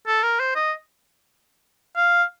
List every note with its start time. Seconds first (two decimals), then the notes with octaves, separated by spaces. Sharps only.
0.07 A4
0.23 A#4
0.40 C5
0.56 D#5
1.97 F5